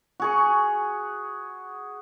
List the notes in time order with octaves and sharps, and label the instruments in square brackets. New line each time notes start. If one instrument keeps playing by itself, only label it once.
[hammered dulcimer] F#4 G#4 C#6